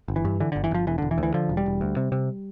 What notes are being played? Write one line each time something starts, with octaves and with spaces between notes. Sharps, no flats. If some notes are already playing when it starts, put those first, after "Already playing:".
G1
E3
G2
D3 E3
G1 D3
E3
G1 F3
E1 E3
E1 D3
E3
D2
E3
D3 F3
E1
G3
E1
D2
C3
C3